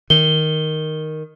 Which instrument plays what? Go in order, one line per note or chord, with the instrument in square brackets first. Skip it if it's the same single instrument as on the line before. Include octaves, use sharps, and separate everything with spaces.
[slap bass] D#3 [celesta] G7